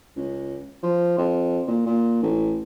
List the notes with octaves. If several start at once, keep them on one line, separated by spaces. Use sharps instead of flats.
C#2
F3
F2
A#2
A#2
A1